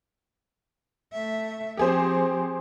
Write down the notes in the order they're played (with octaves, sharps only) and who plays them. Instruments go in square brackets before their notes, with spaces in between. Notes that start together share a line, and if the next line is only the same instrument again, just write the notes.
[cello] A3 E5
[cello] F3 C4 [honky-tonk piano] G4 G#4 C5